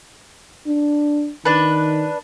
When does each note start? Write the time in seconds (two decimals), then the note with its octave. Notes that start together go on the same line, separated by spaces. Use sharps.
0.67 D4
1.45 D#3 D4 B4